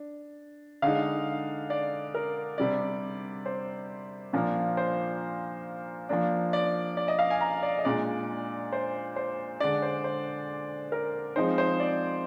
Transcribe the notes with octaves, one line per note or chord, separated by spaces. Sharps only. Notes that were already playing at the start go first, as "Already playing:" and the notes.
Already playing: D4
D3 G#3 D#4 F5
D5
A#4
C3 G3 D4 D5
C5
A#2 F3 A#3 D4
C5
F3 A#3 D4
D5
D5
D#5
F5
G#5
A#5
D5
D#5
A#2 G#3 D4 D5
C5
C5
D3 G#3 D4 D5
C5
C5
A#4
F3 G#3 C4 D#4 C5
C5
D5